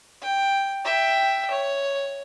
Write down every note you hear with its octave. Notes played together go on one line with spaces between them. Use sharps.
G5
E5 G5
C#5